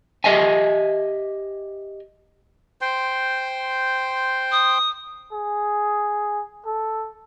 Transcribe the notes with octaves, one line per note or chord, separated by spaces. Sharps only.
G4 D#5 E5 G#5
C5 G5 C6
D#6
G#4
A4